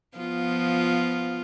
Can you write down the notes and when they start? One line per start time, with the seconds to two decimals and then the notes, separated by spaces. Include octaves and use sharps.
0.18 F3 B3 F4